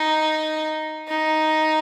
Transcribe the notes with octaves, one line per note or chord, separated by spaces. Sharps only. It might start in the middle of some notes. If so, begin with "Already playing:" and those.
Already playing: D#4
D#4